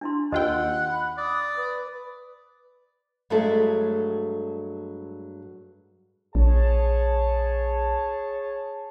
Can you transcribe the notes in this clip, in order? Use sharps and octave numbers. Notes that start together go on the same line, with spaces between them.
D4 E4 C6
D#2 F4 A#4 D#5 F#5 G5
B5
D5 D#6
B4
G2 F#3 G#3 A3 A4
A#1 G#4 C#5 A5